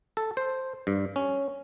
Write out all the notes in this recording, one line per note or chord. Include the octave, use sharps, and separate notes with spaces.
A4
C5
G2
C#4